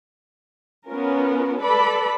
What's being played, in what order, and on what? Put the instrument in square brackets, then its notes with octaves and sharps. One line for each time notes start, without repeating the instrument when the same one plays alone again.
[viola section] B3 C#4 F4 A#4
A4 B4 D5 B5